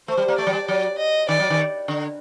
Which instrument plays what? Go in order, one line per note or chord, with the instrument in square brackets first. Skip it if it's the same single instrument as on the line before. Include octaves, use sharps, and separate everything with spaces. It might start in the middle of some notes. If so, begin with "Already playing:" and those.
[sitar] A3 [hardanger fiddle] C5
[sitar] G3
A#3
[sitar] A3 [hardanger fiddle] D5
[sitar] F#3
G3
[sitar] F#3 [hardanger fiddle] D5
[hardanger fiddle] D#5
[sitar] D#3 [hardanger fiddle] D5
[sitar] F#3
D#3
D3